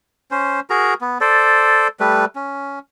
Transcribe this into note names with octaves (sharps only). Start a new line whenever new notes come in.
C#4 C5
F#4 G#4 A#4 A#5
B3
A4 C5 D5
G3 A3 B4
C#4